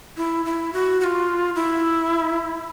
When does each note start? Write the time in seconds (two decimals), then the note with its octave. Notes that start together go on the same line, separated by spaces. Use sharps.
0.17 E4
0.45 E4
0.73 F#4
1.01 F#4
1.04 F4
1.56 E4